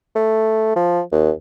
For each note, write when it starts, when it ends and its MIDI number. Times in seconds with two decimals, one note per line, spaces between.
0.16 0.73 57
0.76 1.01 53
1.12 1.31 39